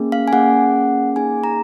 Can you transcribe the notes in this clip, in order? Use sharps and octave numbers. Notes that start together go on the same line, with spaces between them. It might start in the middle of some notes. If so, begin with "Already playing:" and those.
Already playing: A#3 C#4 G#4
F5
G#5
A#3 C#4 G#4 F#5
A#3 D#4 G#4 G#5
A#5